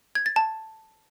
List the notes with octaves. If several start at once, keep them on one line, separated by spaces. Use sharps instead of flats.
G#6
A6
A5